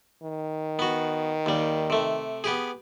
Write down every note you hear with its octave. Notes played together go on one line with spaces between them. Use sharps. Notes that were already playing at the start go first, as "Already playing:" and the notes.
D#3
B3 F#4
D#2 G3
C3 A3
B3 G4 G#4